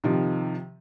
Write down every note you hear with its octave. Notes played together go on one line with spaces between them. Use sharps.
C3 D#3 F3